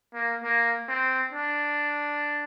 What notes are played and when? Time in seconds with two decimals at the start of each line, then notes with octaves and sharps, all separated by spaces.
0.14 A#3
0.43 A#3
0.88 C4
1.33 D4